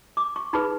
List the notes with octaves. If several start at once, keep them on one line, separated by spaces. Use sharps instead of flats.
D6
C#6
D#4 G#4 B4 B5